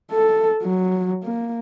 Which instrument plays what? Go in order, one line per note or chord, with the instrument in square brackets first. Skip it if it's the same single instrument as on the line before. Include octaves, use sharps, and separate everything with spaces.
[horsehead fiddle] A4
F#3
A#3